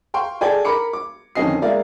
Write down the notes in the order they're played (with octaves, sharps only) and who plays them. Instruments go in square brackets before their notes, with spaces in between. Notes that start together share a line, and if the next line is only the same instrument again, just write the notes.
[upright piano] F5 G5 C6 C#6
G#4 A4 D5 G5 G#5
A#4 B5 D6 C#7
D6
F2 D3 D#3 C#4 D#5 C7
G#3 A#3 E4 D5 F5